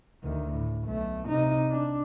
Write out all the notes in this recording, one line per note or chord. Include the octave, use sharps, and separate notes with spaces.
D2 D#3
A2
B1 A3
C3 D#4
D4